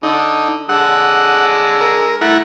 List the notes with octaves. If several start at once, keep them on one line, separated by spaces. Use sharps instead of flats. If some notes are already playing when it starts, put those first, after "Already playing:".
D3 D#4
D3 G#3 F#5 E6
A#4
A3 E4 F#5 A#5